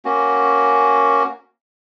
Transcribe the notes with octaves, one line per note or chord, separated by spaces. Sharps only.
A#3 C#4 F#4